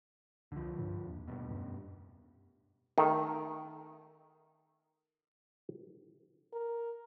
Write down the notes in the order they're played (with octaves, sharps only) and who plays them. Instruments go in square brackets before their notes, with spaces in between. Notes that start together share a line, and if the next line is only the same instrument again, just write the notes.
[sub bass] C2 [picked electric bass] D3 F3
[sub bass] G2
D#2
[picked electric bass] G2 B2
[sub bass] F#2
[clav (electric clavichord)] D#3 A3
[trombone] A#4